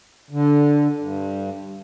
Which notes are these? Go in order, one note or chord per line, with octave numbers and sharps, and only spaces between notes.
D3
G2